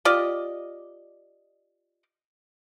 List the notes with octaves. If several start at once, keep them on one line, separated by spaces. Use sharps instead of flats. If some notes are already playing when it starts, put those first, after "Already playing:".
F4 G4 D5 D#5